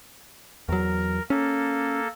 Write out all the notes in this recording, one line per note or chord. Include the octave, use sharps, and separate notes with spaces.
E2 F#3 A#4
A#3 C#4 A4